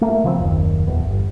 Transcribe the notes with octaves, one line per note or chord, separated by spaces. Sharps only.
A3 A#3
C#3 F3 G3 C4
F#1 D#2
D#1 E2
G1